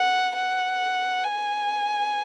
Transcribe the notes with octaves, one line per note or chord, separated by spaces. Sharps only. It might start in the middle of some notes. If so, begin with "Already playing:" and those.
Already playing: F#5
F#5
G#5